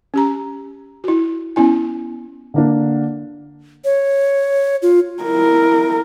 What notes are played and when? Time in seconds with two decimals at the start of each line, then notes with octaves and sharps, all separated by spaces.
0.14 C#4 G4 A#5
1.04 E4 F#4
1.56 B3 C#4 E4 G#5
2.54 D3 A#3 D4
3.85 C#5
4.82 F4
5.23 E4 A#4